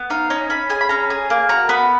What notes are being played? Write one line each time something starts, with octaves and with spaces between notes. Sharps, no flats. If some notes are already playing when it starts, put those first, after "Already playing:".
Already playing: B3
D#4 F5
C#4 D#5
C#4 B5
G#4 G#5
B5
C#4 A#5
G#4
A#3
F#4 A#5
B3 B5